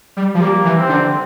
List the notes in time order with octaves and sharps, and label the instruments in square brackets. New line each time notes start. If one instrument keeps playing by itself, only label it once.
[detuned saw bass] G3
F3
[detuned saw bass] G3 [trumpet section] A#3
[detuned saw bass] E3
[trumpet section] C4
[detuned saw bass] D3